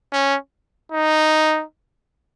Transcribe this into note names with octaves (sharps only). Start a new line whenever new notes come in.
C#4
D#4